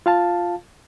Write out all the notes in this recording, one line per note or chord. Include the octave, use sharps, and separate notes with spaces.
F4 F5 A5